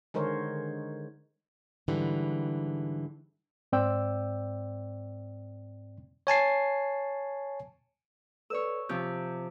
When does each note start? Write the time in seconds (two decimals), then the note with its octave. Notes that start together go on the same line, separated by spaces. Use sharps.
0.14 D3 D#3 G#3 A#4 C5 C#5
1.88 G#2 D3 E3 G3
3.72 G#2 C4 D5 G5 E6
6.27 C#5 G#5 A5 C7
8.50 A4 B4 C#5 D5 E6
8.89 C3 F3 G6